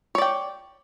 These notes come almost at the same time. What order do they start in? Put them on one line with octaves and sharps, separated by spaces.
C#5 D5 G5